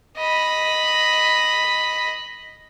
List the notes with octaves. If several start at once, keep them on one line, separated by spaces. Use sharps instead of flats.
D#5 B5